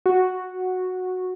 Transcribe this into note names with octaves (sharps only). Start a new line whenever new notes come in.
F#4